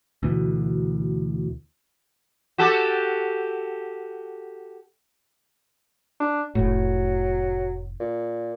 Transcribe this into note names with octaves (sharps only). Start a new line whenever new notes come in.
D2 B2 E3
F#4 G4 A4
D4
F1 A2 F#3
A#2